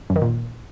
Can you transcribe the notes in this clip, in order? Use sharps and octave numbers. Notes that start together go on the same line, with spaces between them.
F#2
D#3
A#2